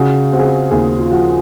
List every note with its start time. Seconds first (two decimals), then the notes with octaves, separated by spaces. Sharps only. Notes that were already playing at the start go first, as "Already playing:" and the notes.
Already playing: C#3 F#4
0.32 C4 F#4
0.40 G#4
0.46 F#4
0.71 D#2 G#4
0.99 F4
1.11 F3 F#4